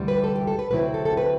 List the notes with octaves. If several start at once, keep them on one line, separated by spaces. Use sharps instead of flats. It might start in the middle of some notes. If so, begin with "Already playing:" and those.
Already playing: D2 C3 E3 G3
B4
A4
G4
A4
B4
D2 C3 F#3 C4 E4 B4
A4
A4
B4